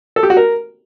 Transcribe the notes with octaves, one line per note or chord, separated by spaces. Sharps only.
A4
G4
F#4
A#4